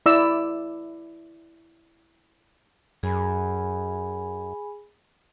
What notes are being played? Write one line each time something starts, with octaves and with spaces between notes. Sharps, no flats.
E4 D5 E6
F#2 G#4 G#5 B5